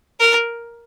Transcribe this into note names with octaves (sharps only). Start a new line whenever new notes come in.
A#4